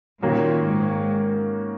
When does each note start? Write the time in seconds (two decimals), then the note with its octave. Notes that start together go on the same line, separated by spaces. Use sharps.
0.22 A#2 D#3 A#3 C#4 F#4
0.65 G#2